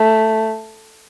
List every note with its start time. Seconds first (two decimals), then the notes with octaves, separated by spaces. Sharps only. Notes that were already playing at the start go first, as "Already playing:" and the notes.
Already playing: A3